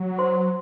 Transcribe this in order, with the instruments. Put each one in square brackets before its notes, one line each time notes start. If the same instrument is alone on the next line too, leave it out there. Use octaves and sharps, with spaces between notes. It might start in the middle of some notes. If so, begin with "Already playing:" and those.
Already playing: [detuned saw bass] F#3
[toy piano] C5 C6